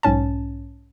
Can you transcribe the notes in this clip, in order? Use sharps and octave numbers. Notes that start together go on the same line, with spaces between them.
B1 G#2 C#4 A5